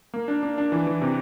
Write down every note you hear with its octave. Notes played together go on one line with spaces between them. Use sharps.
A#3
D4
D4
D4
E3
E3
C3